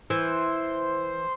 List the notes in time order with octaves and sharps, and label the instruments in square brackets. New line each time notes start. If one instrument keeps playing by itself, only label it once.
[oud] E3 [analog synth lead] C5